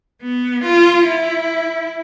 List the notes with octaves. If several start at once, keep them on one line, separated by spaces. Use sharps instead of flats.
B3
F4
E4